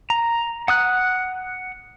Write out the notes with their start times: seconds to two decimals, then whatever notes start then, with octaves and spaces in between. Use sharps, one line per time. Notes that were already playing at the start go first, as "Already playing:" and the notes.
0.10 A#5
0.68 F#5 D#6 F#6